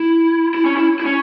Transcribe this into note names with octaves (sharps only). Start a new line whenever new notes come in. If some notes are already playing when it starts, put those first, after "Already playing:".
Already playing: E4
E4
C#4
E4
E4
C#4